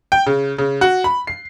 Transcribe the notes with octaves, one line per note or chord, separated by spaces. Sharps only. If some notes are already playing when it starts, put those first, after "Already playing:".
G5
C#3
C#3
F#4
B5
C7